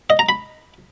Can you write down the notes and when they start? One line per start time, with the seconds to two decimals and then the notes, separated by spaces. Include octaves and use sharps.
0.10 D#5
0.19 A#5
0.29 B5